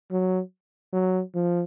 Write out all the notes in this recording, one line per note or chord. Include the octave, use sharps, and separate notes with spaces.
F#3
F#3
F3